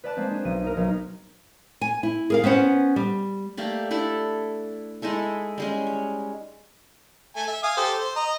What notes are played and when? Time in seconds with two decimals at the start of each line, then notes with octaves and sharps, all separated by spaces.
0.04 B4 D5 A5 F#6
0.17 G#3 A#3 C4
0.31 D4 G#4
0.45 B1 D#7
0.63 D#4 A#4
0.77 B1 A#4
1.81 G#5
2.03 E4
2.30 G#4 A#4 F5
2.44 B3 C#4 C5 F#5
2.96 G3
3.57 A3 A#3 G4 D5
3.91 D4 E4 A4 D5
5.02 G#3 D#4 E4 A4
5.58 G3 G#3 C#4
5.87 C#5
7.36 A3 G#5
7.48 E5
7.63 F5 G#5 D#6
7.77 G4 A4 C5
7.99 C5
8.16 D#5 A#5